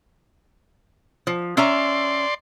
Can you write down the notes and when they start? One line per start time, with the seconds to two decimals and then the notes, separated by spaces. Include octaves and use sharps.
1.27 F3
1.57 C#4 D5 E5 A#5 C6